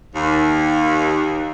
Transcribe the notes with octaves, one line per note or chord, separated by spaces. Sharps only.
D#2